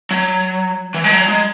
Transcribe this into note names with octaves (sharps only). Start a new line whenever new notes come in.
F#3
E3
G#3
F#3
G#3